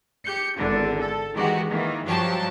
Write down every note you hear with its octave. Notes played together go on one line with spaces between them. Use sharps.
G4 G6 C#7
G#1 E2 D3 D4
A4
D#3 E3 G#3 F#4 G4
D#3 E3 A#3
G2 F3 F#3 G4 A5